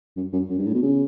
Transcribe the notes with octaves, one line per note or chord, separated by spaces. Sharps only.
F#2
F#2
F#2
G2
A2
B2
C#3